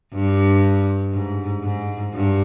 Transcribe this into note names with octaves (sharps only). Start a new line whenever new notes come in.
G2
G#2
G#2
G2